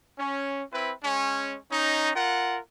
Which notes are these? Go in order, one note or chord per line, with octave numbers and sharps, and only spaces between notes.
C#4
C4 E4 B4
G#3 C#4
C#4 D#4
F4 A#4 F#5